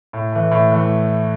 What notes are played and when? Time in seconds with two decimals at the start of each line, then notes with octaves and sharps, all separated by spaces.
0.13 A2
0.32 E3 A3
0.51 A2
0.72 E3 A3